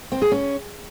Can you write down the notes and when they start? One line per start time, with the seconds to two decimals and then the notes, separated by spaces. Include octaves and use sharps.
0.12 C4
0.22 G#4
0.32 C#4